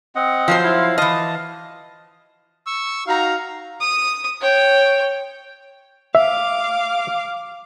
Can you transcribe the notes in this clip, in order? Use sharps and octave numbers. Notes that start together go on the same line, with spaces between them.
C4 D#5 F#5
F3 F#3 C5
E4 F5
E3 D#5 F5 A5
C#6 E6
D#4 F#4 F5 A#5
D#6
C#5 G5
E5 F5 D6